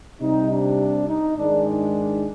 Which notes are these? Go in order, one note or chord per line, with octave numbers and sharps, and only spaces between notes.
C3 G3 D#4
D4
D#4
G#2 D#3 G#3 D4
D4